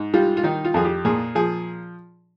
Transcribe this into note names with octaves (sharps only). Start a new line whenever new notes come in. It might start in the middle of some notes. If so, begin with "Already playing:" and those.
Already playing: G#2
G3 F4
F4
D#3 D#4
F4
F2 G#4
G4
A#2 G#4
F3 G#4